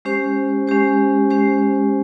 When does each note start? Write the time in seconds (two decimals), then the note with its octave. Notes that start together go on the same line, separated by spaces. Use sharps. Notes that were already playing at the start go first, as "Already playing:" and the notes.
0.05 G#3 C#4 G4 C5
0.68 G#3 C#4 G4 C5
1.30 G#3 C#4 G4 C5